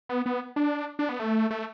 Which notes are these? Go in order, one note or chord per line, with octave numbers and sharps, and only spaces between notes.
B3
B3
D4
D4
B3
A3
A3